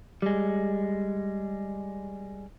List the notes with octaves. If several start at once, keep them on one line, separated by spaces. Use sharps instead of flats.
G3 G#3